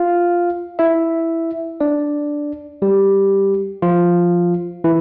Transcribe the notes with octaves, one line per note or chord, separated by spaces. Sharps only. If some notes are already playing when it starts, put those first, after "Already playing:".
Already playing: F4 F5
E4 E5
D4 D5
G3 G4
F3 F4
E3 E4